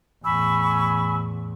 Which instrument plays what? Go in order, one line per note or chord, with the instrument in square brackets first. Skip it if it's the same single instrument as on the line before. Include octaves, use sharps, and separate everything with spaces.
[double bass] E2 A2 [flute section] G#5 B5 C#6 [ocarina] E6